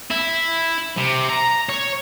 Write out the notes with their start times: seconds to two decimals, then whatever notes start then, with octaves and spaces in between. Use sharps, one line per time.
0.11 E4
0.98 C3
1.29 A#5
1.69 C#5